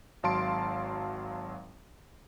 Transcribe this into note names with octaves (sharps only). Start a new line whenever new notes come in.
G#1 F#3 F5 A5 C6 D7